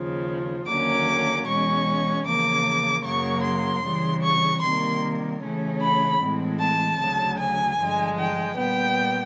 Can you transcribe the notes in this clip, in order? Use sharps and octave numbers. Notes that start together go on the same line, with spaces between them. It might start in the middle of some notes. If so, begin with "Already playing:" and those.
Already playing: D#2 C#3 F3
D#2 D3 F#3 A#3 C#4 D6
E2 B2 G#3 C#4 C#6
E2 C#3 F3 A#3 D6
F#2 C#3 F#3 A#3 C#6
C6
C#3 E3 G3
C#6
C3 D#3 G3 A#3 C6
C#3 E3 A3 C#4
B5
A2 E3 G#3 C4
A5
D2 C#3 F#3
G#5
G2 D3 F3 G#3
G5
A#2 G3 B3 G5